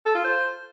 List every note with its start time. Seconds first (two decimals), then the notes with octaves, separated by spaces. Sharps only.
0.06 A4
0.15 F4
0.24 C5